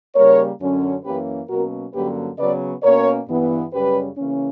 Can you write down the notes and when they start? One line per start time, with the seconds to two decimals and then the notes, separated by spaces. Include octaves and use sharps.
0.15 C#3 G3 A#3 A#4 C#5
0.60 F#2 D3 F#3 C#4
1.04 F#2 E3 A#3 C#4 G4 B4
1.49 B2 F#3 A#3 C#4 F#4 A#4
1.94 G2 D3 F#3 A#3 C#4 G4 B4
2.38 C#3 F#3 B3 B4 D5
2.83 B2 A#3 C#4 A#4 C#5
3.28 G2 E3 B3
3.73 F#2 C#3 G3 C#4 G4 B4
4.17 C#3 E3 A#3 C#4